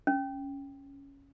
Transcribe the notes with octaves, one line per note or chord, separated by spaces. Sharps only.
C#4